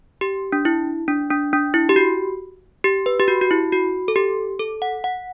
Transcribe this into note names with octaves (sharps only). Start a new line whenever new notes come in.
G4
D4
E4
D4
D4
D4
E4
G4
F#4
G4
B4
G4
F#4
F#4
E4
F#4
A4
G4
A4
F#5
F#5